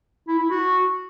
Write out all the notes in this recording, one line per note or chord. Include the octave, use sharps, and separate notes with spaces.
E4
E4
F#4